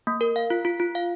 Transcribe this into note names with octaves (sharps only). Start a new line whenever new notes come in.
A#3
A#4
F5
F4
F4
F4
F5